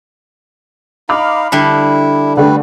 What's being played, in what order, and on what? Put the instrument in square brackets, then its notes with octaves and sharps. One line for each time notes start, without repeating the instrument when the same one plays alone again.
[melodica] D#4 F5 [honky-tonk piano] B5 D6 F6
[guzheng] D3 G3 D4 [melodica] E4
[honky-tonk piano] D3 A3 D4 [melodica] G3 B4